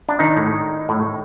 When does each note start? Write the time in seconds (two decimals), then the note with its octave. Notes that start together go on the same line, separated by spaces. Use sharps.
0.09 D4
0.19 D#3 D#4
0.37 A2
0.89 A2